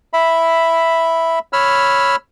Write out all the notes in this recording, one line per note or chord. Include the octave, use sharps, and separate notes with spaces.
E5 B5
C#5 B5 E6 F6